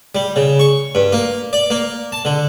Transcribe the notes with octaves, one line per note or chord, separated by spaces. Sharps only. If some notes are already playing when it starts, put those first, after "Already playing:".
G3
C#3
C#6
G2
A#3
D5
A#3
A5
D3